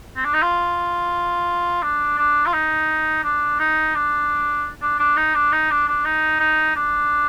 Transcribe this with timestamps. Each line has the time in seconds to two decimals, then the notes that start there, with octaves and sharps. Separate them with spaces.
0.16 C4
0.25 D4
0.34 D#4
0.42 F4
1.83 D4
2.18 D4
2.46 F4
2.54 D#4
3.24 D4
3.59 D#4
3.95 D4
4.82 D4
4.99 D4
5.17 D#4
5.34 D4
5.52 D#4
5.71 D4
5.88 D4
6.05 D#4
6.40 D#4
6.76 D4